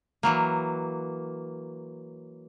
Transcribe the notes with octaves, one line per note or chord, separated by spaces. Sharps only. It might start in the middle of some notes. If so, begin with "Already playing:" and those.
E3 F#3 A#3